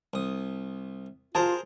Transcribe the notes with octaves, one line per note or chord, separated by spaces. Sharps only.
C2 D#6
F4 G#4 A#4 C5 A5